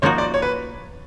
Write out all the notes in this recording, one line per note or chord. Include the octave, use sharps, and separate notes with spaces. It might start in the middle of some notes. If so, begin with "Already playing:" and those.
F3 A#3 D#4 F#4 C#5
D5
C#5
B4